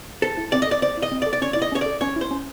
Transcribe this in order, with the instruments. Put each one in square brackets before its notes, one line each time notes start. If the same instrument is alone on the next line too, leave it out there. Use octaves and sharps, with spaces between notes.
[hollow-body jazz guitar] A4 [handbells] C5
[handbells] E4
[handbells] C4 [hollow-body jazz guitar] D5
[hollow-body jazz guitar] D#5
[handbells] A4 [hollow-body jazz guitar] D5
[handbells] C5 [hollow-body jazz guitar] D5
[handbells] E4
[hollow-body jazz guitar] D#5
[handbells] C4
[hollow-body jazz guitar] D5
[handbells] A4
[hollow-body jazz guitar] D5
[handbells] C#4 [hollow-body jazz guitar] C#5
[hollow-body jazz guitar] D5
[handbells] E4
[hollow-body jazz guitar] D#5
[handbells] C#4 [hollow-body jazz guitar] C#5
[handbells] A4 [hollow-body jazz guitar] D5
[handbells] C#4 [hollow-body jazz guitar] C#5
[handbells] E4 [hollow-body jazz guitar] C5
[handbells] C#4